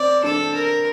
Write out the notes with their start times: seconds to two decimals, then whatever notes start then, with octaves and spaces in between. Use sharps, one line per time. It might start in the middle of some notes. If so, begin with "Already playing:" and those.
Already playing: C4 D5
0.23 D4 A4
0.55 A#4